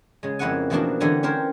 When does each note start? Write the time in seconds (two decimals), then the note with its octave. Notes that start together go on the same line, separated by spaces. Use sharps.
0.23 C#3 G#3
0.39 F2 A#3 E4 C#5 F#5 G#5
0.70 B2 E3 F3 A#3 D4 F#4
1.00 D3 E3 G3 C#5 G#5 A#5
1.23 C#4 G4 A#4 C5 C#5